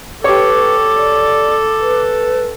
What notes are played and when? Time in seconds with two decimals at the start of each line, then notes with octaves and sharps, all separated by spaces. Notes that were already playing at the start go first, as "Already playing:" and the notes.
0.24 G4 A4 B4 C#5 D6
0.95 D5
1.80 B4